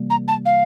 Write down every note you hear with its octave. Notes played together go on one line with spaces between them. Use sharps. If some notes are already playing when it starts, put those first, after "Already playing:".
Already playing: C3 E3 G3 A#3
A#5
A5
F5